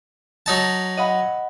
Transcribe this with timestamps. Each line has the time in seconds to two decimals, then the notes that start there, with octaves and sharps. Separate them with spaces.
0.46 F#3 D#4 A5
0.97 D#5 F#5 B5